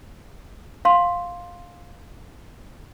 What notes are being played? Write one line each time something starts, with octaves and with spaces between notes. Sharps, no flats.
F5 C6